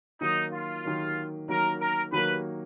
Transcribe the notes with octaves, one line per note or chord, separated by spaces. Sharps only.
D#3 F#3 A#3 D#4
F4
D#3 F#3 A#3
D#3 F#3 A#3 A#4
A#4
D#3 F#3 A#3 B4